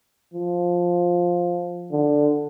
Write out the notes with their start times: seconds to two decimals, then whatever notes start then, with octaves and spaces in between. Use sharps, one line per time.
0.34 F3
1.92 D3